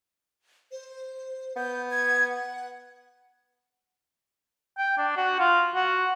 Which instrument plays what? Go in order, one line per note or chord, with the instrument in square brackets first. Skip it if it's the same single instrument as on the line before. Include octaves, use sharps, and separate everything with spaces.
[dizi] C5
[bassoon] B3 [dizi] G6
[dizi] G#6
F#5
[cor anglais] G5
D4
F#4
F4
F#4